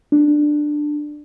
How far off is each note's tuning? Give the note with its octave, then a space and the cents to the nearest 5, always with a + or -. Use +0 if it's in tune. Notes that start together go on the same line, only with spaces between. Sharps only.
D4 +10